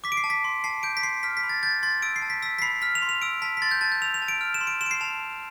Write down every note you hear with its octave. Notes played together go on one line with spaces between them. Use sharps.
D6 B6
D7
C7
A5
B6
C6
A5 C7
G6 D7
B6
C6 C7
F6 B6
B6
B5
A6
G6 A6
C6 A6
E6 D7
C7
A5
B6
E6 B6
B6
B5 C7
F6 B6
F7
C6
F7
E6 D7
A5 B6
B6
C6 A6
G6
A5 A6
G6
E6 F7
F7
A5
D7
F6
E7
C6
D7
C6 E7
D7
C7
A5 F7